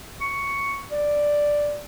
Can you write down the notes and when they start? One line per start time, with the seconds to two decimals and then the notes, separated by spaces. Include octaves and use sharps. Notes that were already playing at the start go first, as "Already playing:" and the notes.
0.21 C#6
0.91 D5